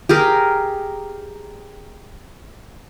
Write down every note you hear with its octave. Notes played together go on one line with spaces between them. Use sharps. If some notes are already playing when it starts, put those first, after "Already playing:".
G4 G#4 A#4